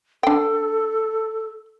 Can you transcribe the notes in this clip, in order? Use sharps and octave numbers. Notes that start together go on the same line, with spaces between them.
D4 A4 G5